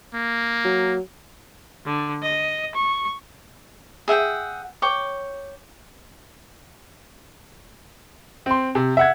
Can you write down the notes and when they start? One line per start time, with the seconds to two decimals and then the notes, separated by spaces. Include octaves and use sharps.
0.14 A#3
0.65 F#3
1.85 D3
2.22 D#5
2.75 C#6
4.08 G#4 E5 F#5 G5
4.82 C#5 G5 D6
8.46 C4 C6
8.75 C3
8.97 E5 F#5 G#6